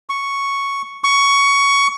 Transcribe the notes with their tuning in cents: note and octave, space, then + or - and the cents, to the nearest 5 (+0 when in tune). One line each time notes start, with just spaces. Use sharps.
C#6 +0
C#6 +15